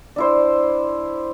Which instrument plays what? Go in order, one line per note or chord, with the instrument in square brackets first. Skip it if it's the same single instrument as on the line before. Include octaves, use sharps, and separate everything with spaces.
[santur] D4 E4 C5